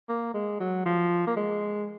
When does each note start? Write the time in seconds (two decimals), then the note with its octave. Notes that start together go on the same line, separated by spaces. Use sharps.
0.09 A#3
0.34 G#3
0.60 F#3
0.86 F3
1.27 A#3
1.37 G#3